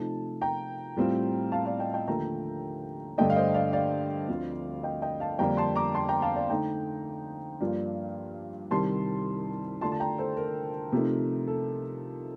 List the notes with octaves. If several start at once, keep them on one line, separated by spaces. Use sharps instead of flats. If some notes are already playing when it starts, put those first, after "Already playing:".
Already playing: C3 F3 A3 D#4 A5
G5 A#5
A2 G3 C4 F4
F5 A5
D5 F5
D#5 G5
D#5 G5
D#2 D3 F3 A3 G5 A#5
G2 D3 A3 D4 D#5 G5
F5
C5 D#5
D5 F5
D5 F5
D2 D3 F3 C4
D#5 G5
D#5 G5
F5 A5
F2 D3 G3 A#3 D4 G5 A#5
A5 C6
A#5 D6
A5 C6
G5 A#5
F5 A5
D5 F5
D3 A3 D#4 G5 A#5
G2 F3 A#3 D4 F4
C2 C3 D#3 G3 A5 C6
D3 A3 D4 F4 A5 C6
A5
G5 A#5
A4 C5
A#4
C3 F3 A3 D#4
A4